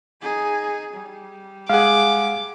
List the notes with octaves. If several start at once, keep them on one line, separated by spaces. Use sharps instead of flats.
D#4 G#4
G3
G#3 G#4 F5 F#5 D6